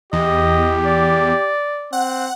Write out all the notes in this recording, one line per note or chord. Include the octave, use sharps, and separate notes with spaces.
E2 G4 D#5
D5
C4 F#5